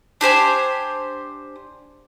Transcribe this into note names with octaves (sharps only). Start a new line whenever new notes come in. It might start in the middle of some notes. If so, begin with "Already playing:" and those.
D4 G4 C5 G#5